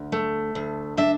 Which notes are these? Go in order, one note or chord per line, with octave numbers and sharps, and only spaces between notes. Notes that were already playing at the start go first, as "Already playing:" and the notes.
Already playing: D2
A3
D2
D4 E5